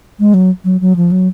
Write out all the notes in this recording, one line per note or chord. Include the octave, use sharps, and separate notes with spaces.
G#3
F#3
F#3
F#3
F3
F#3